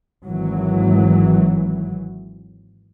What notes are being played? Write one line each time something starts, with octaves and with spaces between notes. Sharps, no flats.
G#1 E3 F#3